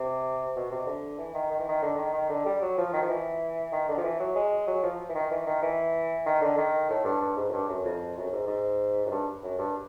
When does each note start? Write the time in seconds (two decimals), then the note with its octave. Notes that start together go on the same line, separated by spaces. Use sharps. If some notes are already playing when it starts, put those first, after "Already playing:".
Already playing: C3
0.56 B2
0.71 C3
0.87 D3
1.18 E3
1.34 D#3
1.51 D#3
1.60 E3
1.68 D#3
1.83 D3
1.97 D#3
2.13 D#3
2.29 D3
2.46 G3
2.62 F#3
2.78 F3
2.93 D#3
3.02 F3
3.09 E3
3.72 D#3
3.88 D3
3.98 F3
4.03 E3
4.20 F#3
4.36 G#3
4.67 F#3
4.83 F3
5.09 E3
5.15 D#3
5.31 E3
5.47 D#3
5.62 E3
6.26 D#3
6.41 D3
6.57 D#3
6.90 A2
7.05 G2
7.21 G2
7.37 G#2
7.49 F#2
7.53 G2
7.68 F#2
7.85 F2
8.17 F#2
8.32 G#2
8.47 G#2
9.06 F#2
9.11 G2
9.43 F#2
9.59 G2